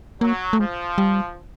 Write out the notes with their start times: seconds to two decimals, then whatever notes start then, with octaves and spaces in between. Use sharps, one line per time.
0.21 F#3 A#3
0.53 A3
0.59 F3 G#3
0.98 G3